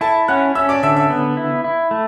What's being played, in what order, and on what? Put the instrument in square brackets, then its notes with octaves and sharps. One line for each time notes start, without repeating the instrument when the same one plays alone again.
[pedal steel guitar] E4 [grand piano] A4 A5
[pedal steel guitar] C#4 [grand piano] F#5 F#6
[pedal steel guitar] C#4 [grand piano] E5 E6
[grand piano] D5 D6
[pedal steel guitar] D3 [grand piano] E5 E6
[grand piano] E5 E6
[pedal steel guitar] B3
E4
E4
A3